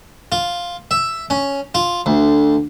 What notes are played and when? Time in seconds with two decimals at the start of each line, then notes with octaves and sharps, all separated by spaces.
0.32 F4
0.91 E5
1.30 C#4
1.75 F4
2.06 D2